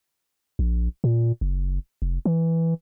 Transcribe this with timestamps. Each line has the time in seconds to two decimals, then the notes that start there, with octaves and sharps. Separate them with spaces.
0.59 A#1
1.04 A#2
1.41 F#1
2.02 F1
2.25 E3